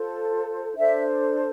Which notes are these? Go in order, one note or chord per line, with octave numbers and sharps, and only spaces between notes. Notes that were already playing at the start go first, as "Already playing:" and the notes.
Already playing: F4 A4 C5
D4 A4 C5 E5